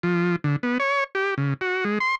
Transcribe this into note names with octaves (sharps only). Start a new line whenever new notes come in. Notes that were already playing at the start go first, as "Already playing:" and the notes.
F3
D3
B3
C#5
G4
C#3
F#4
G#3
C6